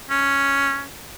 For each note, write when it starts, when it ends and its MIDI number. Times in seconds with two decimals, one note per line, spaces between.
0.10 0.83 61